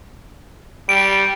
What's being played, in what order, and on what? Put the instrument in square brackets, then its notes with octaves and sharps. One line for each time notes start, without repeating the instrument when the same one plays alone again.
[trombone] G3 [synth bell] D7